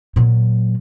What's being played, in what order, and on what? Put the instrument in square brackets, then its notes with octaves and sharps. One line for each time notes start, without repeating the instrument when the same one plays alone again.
[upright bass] A#2 F#3